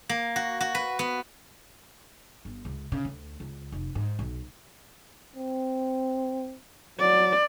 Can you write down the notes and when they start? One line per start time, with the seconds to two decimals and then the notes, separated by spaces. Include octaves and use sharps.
0.09 A#3
0.36 F#4
0.61 F#4
0.75 B4
0.99 B3
2.45 G1
2.65 C#2
2.92 C#3
3.05 D2
3.40 C#2
3.72 F1
3.95 G#2
4.19 B1
5.36 C4
6.99 F#3 D5